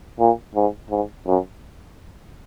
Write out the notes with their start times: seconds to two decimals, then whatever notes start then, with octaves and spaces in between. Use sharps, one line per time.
0.19 A#2
0.55 G#2
0.90 G#2
1.27 F#2